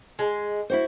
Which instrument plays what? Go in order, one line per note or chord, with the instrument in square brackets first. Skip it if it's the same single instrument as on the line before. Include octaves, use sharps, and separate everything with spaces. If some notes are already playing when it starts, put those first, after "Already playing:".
[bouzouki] G#3
[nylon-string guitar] E4 F#4 C5